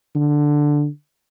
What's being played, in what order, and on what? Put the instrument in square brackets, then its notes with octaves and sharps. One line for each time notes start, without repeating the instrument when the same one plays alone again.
[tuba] D3